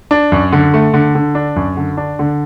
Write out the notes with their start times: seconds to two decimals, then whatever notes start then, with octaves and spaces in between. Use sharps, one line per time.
0.11 D4
0.32 F#2
0.52 D3
0.74 A3
0.94 D3
1.15 D3
1.35 D4
1.56 F#2
1.77 D3
1.97 D4
2.19 D3